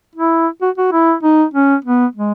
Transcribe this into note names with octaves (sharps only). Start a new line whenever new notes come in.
E4
F#4
F#4
E4
D#4
C#4
B3
G#3